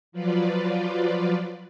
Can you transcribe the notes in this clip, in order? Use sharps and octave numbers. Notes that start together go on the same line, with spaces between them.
F3 F#3 F4 B4 D5